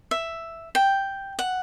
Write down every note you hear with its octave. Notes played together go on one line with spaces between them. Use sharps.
E5
G5
F#5